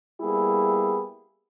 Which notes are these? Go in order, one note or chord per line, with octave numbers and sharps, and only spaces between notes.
G3 A#3 B3 E4 G4 G#4